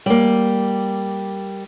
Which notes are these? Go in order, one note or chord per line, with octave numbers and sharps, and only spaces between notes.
G3 A#3